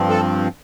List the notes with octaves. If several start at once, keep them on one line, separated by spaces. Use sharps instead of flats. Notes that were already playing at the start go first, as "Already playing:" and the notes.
Already playing: G2 F3 C4
A4